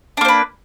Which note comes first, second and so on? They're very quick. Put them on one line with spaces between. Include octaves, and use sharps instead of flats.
D4 A#3 C5 B4